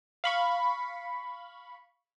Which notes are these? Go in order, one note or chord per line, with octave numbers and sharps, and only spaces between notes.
F5 B5 C#6